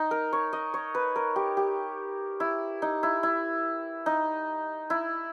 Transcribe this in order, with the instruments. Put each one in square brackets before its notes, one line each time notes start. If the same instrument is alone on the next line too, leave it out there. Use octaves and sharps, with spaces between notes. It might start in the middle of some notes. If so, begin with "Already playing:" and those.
Already playing: [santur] D#4
A#4
C#5
D#5
C#5
B4
A#4
G4
G4
E4
D#4
E4
E4
D#4
E4